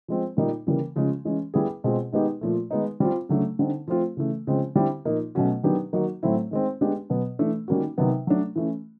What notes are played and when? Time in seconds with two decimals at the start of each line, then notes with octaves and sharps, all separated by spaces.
0.08 F3 G#3 C4
0.37 A#2 G3 A#3 D#4
0.67 C#3 E3 G3 A#3
0.96 C#3 F3 G#3 C#4
1.25 E3 G#3 C#4
1.54 G3 B3 E4 G#4
1.84 B2 G#3 C4 F4 G#4
2.12 D#3 G#3 B3 D#4 G4
2.41 A#2 F3 A3
2.71 D#3 G#3 B3 D#4
3.00 G3 C4 F4
3.29 C#3 F#3 A3 D4
3.59 D3 G3 C4 D#4
3.88 F3 A3 C4 F4
4.17 C#3 E3 A3
4.47 C#3 F3 G#3 C4
4.76 D3 G3 C4 E4 G4
5.05 A#2 F3 A#3 D#4
5.35 B2 F#3 A3 C#4 F#4
5.63 D#3 F#3 B3 D4 G4
5.93 D#3 F#3 A#3 D#4 F#4
6.23 A2 F#3 A3 C4 E4
6.51 D#3 G#3 C4
6.81 G#3 B3 D4 G4
7.10 B2 F#3 B3
7.39 E3 A3 D4
7.68 D#3 G3 A#3 C#4 F#4
7.98 C3 D#3 F#3 B3
8.27 F#3 A3 D4
8.56 E3 A3 C#4